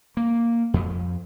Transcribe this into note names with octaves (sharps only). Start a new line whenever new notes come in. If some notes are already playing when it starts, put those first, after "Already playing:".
A#3
F2